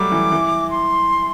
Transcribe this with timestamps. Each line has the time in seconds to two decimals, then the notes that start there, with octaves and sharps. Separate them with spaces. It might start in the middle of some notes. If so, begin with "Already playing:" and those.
Already playing: F#3 G3 A3 D6
0.12 E3
0.32 E3
0.70 C6